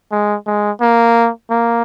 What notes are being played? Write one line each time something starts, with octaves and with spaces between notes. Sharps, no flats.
G#3
G#3
A#3
A#3